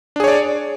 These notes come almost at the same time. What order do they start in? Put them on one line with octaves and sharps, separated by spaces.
D4 G#4 C#5 D5